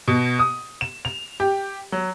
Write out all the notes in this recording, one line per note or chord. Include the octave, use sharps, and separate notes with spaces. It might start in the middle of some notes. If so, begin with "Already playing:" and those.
B2
D#6
E7
F7
G4
F#3